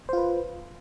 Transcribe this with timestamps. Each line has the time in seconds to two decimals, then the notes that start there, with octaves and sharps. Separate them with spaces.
0.09 C5
0.13 F4
0.17 B4